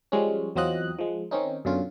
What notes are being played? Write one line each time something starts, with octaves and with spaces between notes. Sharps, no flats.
F3 G3 G#3 C#4
E2 F#3 C4 F4 D#5 F#6
F3 G#3
D#3 C4 C#4 D#4
F#2 B2 D3 C#4 F4